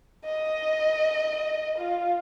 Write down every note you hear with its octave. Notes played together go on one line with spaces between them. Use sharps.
D#5
F4